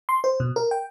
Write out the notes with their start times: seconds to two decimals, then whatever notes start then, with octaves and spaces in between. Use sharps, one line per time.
0.09 C6
0.24 C5
0.40 B2
0.56 A#4
0.71 G5